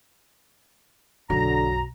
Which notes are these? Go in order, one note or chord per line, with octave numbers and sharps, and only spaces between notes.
B1 F#2 D3 F#3 A#5